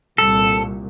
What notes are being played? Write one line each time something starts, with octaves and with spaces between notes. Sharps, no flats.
C2 A#2 A4